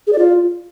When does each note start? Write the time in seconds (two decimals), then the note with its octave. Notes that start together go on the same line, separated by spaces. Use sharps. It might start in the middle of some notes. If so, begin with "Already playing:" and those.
0.07 G#4
0.13 D5
0.18 F4